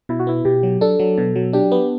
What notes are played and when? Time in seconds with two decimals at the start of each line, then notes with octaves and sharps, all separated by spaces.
0.09 B2 E4
0.19 F#4
0.27 B3 E4
0.45 B2 G4
0.63 F#3
0.81 D4 A4
0.99 F#3
1.18 B2
1.36 F#3
1.53 D4 G4
1.72 B3